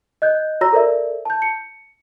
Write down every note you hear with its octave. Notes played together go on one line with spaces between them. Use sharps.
D#5 F#6 G6
F#4 C#5 A#5 E6 A#6
A4 A#4 C5 D5 E5
A5 G6
C#7